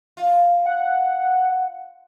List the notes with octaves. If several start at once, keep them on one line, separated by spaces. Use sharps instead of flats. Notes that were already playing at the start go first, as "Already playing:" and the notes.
F4
F#5